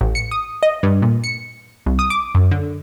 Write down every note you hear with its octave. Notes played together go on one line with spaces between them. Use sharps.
A1
C#7
D#6
D#5
G2
A#2
C#7
C2
D#6
D6
F#2
D3